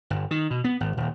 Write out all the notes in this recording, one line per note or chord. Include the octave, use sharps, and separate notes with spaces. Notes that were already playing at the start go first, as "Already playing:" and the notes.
G1
D#3
B2
B3
G#1
D#1